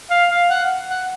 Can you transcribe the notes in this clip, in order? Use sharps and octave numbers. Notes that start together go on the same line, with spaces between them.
F5
F5
F#5
F#5